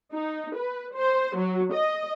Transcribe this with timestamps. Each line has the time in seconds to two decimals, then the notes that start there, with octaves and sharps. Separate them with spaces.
0.13 D#4
0.56 B4
0.95 C5
1.36 F#3
1.72 D#5